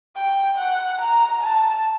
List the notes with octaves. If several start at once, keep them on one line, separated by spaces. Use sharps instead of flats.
G5
F#5
A#5
A5